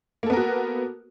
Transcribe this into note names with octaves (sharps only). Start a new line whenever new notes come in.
A#3 B3 F#4 A4 A#4